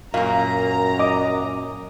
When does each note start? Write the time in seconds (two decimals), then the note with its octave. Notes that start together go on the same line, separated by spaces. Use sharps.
0.14 F#2 A#2 A#3 F5 A#5
0.99 D#5 D6